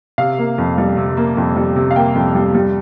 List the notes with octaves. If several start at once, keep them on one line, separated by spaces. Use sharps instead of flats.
C3 F5
A#3
F2
G3
C3
A#3
F2
G3
C3
F5
A#3 G5
F2
G3
G3